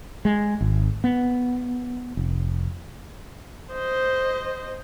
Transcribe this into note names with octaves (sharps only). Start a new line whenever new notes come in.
G#3
G#1
B3
F1
C5 D#5